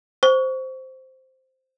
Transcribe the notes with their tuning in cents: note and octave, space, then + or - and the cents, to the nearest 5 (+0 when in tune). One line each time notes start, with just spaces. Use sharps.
C5 +0 C#6 +30